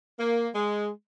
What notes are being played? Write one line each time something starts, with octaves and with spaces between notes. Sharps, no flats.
A#3
G#3